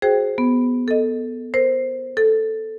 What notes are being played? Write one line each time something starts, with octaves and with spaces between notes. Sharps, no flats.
F#4 G#4 C5 G5
B3
A4 D#5
A#4 C5
A4